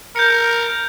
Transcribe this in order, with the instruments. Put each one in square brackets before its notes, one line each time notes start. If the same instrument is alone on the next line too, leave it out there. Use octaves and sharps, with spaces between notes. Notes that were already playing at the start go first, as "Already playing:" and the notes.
[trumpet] A#4 [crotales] G6 C#7